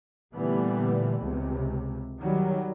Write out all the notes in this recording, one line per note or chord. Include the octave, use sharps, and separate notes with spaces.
A#2 D3 E3 G3 A3 B3
C#2 C3
D#3 F#3 G3